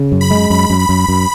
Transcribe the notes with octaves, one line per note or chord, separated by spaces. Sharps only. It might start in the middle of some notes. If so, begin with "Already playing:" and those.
Already playing: C#3
F#2
B5
G#3
F#2 B5
F#2
B5
F#2
F#2